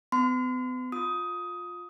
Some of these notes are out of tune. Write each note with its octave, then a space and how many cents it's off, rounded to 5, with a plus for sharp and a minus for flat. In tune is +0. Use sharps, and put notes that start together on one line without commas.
B3 +40 C6 -40
F4 +20 D#6 +15